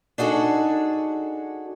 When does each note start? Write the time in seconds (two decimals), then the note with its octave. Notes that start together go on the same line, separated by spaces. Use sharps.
0.18 D4 D#4 F#4 G#4 A4